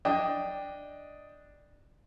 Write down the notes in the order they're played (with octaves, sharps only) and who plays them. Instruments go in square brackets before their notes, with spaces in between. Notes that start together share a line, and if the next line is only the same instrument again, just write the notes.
[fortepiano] D4 D#5 G5